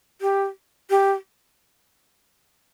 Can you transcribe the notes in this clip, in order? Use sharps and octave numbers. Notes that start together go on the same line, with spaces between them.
G4
G4